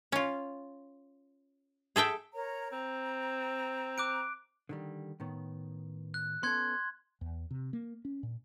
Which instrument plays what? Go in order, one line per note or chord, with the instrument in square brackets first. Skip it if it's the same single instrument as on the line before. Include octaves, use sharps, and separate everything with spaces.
[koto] C#4 F4
G#4 A4 E5 G5
[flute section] A#4 C#5 A#5
[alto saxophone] C4 [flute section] A#5
[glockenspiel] D6 F#6 D7
[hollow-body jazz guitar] D3 D#3 G3
A2 D#3 B3
[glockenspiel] F#6
[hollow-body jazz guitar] B3 C#4 A4 [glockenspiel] C6 F#6 G#6
[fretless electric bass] E2
C3
A#3
C#4
A#2